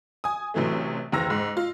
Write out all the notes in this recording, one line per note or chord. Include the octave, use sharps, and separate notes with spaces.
G#5 D#6
A1 C3 E3 F#3 A3
F#1 D#2 E3 A#5 E6 A#6
G#2
F4